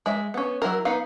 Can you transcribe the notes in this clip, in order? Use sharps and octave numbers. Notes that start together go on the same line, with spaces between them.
G#3 E5
B3 C#4
F#3 E4 A#4
B3 D#4 F5